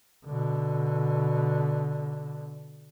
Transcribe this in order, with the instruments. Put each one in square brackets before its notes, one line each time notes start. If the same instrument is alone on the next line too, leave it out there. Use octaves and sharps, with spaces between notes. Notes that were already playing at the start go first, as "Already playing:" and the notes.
[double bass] B2 D3